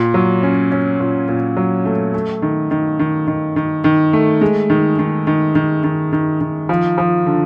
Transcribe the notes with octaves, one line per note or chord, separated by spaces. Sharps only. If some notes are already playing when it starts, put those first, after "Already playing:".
Already playing: A#2
F#3
C#4
C#4
A#2
A#2
F#3
A3
A3
D#3
D#3
D#3
D#3
D#3
D#3
A3
G#3
D#3
D#3
D#3
D#3
D#3
D#3
D#3
F3
F3
D3